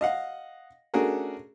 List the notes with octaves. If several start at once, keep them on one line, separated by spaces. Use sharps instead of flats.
D#5 F5 F#5
A3 C#4 D4 F#4 G#4 A#4